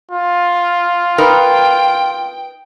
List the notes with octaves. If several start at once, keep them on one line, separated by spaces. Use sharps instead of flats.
F4
D#4 A#4 B4 G5